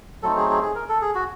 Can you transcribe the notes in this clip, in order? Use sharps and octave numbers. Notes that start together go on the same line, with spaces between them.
F#3 A3 C4 D#4 A4
G#4
G#4
G#4
A#4
A4
G#4
F#4